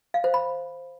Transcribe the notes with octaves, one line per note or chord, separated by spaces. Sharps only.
F5
C5
B5